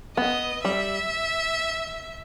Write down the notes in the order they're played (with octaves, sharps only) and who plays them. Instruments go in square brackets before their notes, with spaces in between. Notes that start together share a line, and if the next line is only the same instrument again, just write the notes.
[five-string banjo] B3 [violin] D#5
[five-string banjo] G3 [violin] E5